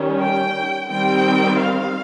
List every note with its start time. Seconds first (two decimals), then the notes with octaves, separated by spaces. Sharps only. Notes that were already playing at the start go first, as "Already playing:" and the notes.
Already playing: D#3 G3 C#4
0.20 G5
0.90 D#3 G3 C4 G5
1.58 F5